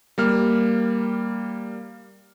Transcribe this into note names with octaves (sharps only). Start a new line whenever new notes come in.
G3 A#3 F6